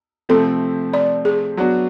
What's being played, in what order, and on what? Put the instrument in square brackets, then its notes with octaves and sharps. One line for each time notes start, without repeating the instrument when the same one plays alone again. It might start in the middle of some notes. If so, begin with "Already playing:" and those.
[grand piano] C3 F3 A3 C4 [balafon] A4
[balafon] D5
G#4
[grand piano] F#3 B3 D4 F#4